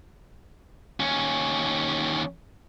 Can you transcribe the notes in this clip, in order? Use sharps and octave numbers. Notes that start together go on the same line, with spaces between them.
D#2 C#4